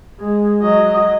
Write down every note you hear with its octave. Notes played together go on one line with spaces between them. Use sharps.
G#3
F#3 D#5